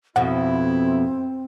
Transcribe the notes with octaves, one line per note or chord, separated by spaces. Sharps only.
F2 B2 C4 E4 F#5